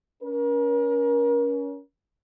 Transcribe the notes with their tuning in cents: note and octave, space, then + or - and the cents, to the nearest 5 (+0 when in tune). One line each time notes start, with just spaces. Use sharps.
C#4 +25 A#4 +35